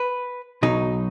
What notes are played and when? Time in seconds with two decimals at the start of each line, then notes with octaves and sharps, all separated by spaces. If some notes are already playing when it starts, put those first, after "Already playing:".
Already playing: B4
0.63 B1 B2 F#3 D#4